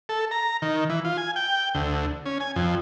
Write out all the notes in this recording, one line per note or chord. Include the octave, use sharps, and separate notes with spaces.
A4
A#5
D#3
E3
F4
G#5
G5
D2
C#4
G#5
F2